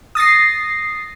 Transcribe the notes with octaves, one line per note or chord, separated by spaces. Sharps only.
D#6 A6 A#6 C7